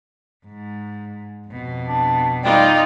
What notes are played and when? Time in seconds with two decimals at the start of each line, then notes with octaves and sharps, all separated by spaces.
0.46 G#2
1.48 F2 B2
1.88 D4
2.44 G3 D#4 F4 D5 G5